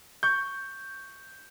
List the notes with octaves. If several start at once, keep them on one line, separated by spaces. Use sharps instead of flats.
C#6 G6